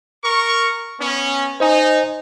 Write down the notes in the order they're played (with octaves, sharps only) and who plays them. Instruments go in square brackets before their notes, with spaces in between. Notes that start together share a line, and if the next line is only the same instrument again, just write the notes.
[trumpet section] A#4 C#6
B3 C#4
[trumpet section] D#4 [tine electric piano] C5 D#5 G#5